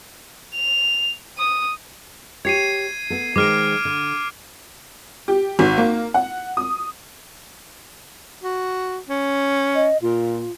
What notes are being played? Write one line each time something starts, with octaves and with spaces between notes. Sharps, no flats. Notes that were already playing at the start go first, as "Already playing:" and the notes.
F7
D#6
G4 C#5 G#6 C7 D#7
B3 A4
D#3 G#3 C5 D6 F6 D7
D3
G4
G#1
A#3
F#5
D#6
F#4
C#4
D#5
A#2 F4